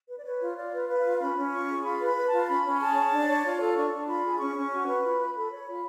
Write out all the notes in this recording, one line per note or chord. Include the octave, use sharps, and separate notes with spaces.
B4
D5
B4 C#5
F4
F4 D5
B4 F5
B4
F5
F4
C#4 B5
C#4
F4 C#6
G#4
F4 B5
B4
B5
B4
A5
F4
C#4 B5
C#4
G#4 A5
C#5
D4
C#5
F4
A4
D4 C#6
D4
F4 B5
G#4
C#4 C#6
C#4
F#4
B4
F4 B5
F4
A4 B5
C#5
F4 B5